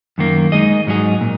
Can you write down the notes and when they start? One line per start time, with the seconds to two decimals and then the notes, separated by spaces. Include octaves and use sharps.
0.18 F#2 D#3 A#3
0.52 G#3 D#4 G#4 D#5
0.87 G#2 F#3 D#4 G#4
1.21 A#2